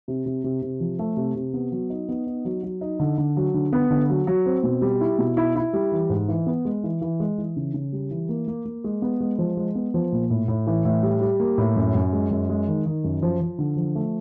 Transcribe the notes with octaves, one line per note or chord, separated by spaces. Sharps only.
C3
C3
C3
C3
F3
A3
C3
C3
B3
F#3
D#4
B3
D#4
F#3
F#3
D#4
D3
D3
F#3
D3
B3
D3
F#3
F#3
C4
B2
G3
E4
B2
E4
E4
G3
E3
G#2
E3
B3
G#3
E3
E3
G#3
E3
C#3
C#3
G3
E3
A#3
A#3
A#3
G#3
B3
G#3
F3
G#3
B3
F3
A#2
A2
A2
E3
A2
G3
G3
A#3
A2
F#2
F#2
G#3
F#2
G#3
D#3
D#3
F#2
F3
F3
D3
F3
A3